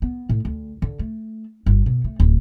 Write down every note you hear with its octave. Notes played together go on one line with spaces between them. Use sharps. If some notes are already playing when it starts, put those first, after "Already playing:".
B3
A2
D2
D3
A3
G1
B2
A3
D1